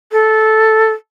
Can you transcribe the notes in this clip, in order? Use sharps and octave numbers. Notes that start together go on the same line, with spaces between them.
A4